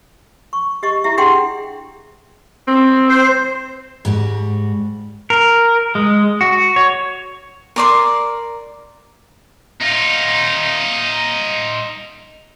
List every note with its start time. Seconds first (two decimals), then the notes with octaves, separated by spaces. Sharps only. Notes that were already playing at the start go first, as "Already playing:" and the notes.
0.53 C#6
0.83 G4 D#5 C#6
1.04 E4 G4 E5
1.17 D4 G4 G#4 F#5 G5 C6
2.67 C4
3.09 C5
4.05 G#2 G3 F#4
5.30 A#4
5.95 G#3
6.41 F#4
6.76 C#5
7.76 A#4 D5 C6
9.81 D#4 F4